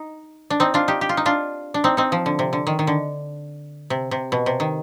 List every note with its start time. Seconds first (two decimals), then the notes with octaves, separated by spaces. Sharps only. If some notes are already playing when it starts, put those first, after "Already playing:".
Already playing: D#4
0.50 D4
0.60 C4 D#4
0.74 D4 F4
0.88 D#4 G4
1.01 G4
1.09 F4
1.17 D#4
1.26 D4 F4
1.74 D4
1.84 C4 D#4
1.97 C4 D#4
2.12 F3
2.26 D3
2.39 C3
2.53 D3
2.67 D#3
2.79 D#3
2.87 D3
3.90 C3
4.11 C3
4.32 B2
4.46 C3
4.60 D#3